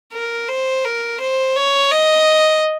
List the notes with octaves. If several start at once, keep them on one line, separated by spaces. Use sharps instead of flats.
A#4
C5
A#4
C5
C#5
D#5